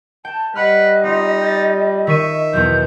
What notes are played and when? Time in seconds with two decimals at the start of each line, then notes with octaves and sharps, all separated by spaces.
0.25 G5 A5
0.55 G3 B4 D#5 F#5 B5 F6
1.03 C4 D#4 F4
1.41 G6 A6
2.07 D#3 E5 C#6 D#7
2.53 B1 E2 G6